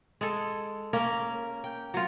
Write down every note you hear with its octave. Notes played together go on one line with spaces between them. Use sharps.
G#3 A4
A#3 C#4 A#4
G5
F#3 F4